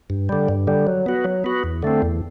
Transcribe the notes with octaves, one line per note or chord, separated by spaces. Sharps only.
G2
D3 G3
G2
D3 G3
F#3
B3 F#4
F#3
B3 F#4
E2
D3 A3 C4
E2